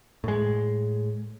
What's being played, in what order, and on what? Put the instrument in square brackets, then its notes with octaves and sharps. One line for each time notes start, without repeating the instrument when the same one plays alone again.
[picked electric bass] A2 G#3